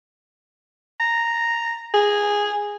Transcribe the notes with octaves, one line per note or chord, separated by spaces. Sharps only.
A#5
G#4